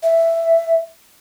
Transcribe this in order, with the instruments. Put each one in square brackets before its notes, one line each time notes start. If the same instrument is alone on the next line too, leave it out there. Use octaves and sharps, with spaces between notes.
[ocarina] E5